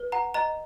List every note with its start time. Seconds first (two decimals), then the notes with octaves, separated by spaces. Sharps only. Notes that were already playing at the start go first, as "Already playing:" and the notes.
Already playing: B4
0.12 F#5 A#5
0.34 D#5 A#5